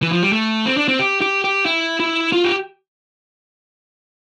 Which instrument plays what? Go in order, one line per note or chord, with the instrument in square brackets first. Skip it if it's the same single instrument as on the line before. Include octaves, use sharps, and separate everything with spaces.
[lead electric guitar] E3
F3
G3
A3
C4
D4
C4
G4
G4
G4
E4
E4
F4
G4